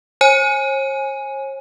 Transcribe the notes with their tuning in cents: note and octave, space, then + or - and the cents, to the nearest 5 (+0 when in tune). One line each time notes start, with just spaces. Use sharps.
C#5 -45 G#5 +0